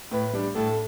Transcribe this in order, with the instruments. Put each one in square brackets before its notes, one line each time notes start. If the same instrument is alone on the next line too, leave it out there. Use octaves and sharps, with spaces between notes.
[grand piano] A2 [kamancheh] B4
[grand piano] G3 D4
[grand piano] A2 [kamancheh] A4